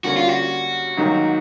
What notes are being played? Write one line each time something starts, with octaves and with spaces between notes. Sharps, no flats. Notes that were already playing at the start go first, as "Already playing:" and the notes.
D3 G3 A#3 C#4 F#4
F4
F#4
G#2 D#3 F#3 A#3 D#4